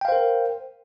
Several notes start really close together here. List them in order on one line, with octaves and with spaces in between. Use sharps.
G5 F5 C5 A#4